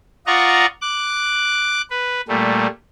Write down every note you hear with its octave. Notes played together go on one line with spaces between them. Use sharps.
F4 D5 D#5 F#5 A#5 C#6
D6 F#6
B4
A#2 G3 A3